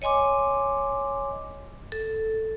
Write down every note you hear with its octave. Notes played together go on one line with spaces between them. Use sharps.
C#5 D#5 G#5 C6 D6
A4